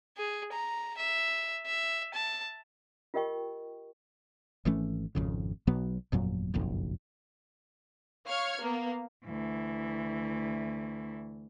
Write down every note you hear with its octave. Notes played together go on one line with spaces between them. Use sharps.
G#4
A#5
E5
E5
A5
F4 G4 A#4 D#5 G5 C#6
G#1 E3 A3 C#4
G#1 F2 C#3
B1 B2 F#3 B3
G1 F2 A#2 F#3
F#1 B1 F2
C#5 F5 F6 G#6 C#7
A#3 B3
D2 E3